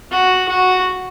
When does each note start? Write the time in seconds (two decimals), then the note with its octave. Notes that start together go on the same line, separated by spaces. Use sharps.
0.11 F#4
0.48 F#4